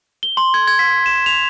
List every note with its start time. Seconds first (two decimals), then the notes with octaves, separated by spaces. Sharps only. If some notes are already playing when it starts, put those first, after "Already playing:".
0.23 G7
0.37 C6
0.54 G#6
0.68 G#6
0.79 B6
1.06 E7
1.26 F7